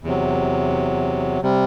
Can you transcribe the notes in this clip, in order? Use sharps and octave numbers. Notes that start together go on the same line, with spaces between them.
E2 C3 F#3
C3 G3